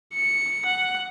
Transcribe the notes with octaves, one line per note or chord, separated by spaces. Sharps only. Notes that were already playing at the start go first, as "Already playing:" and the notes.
C#7
F#5